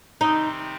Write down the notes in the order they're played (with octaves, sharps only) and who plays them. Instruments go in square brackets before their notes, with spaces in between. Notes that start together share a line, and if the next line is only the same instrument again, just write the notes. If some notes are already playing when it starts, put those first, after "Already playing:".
[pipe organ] C3 D#3 G3 C4 [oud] D#4